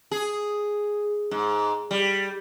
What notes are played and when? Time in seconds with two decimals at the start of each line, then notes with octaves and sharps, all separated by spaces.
0.11 G#4
1.31 G#2
1.91 G3